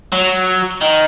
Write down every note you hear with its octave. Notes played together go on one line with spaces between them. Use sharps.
F#3
D#3